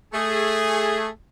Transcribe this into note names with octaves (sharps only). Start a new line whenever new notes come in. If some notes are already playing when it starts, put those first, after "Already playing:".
A3 G#4